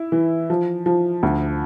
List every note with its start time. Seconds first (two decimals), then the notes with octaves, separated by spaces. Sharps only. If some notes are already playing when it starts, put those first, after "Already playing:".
Already playing: E4
0.12 E3
0.50 F3
0.86 F3
1.23 D2